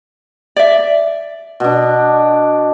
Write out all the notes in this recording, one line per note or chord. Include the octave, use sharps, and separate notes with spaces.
D5 E5
B2 D4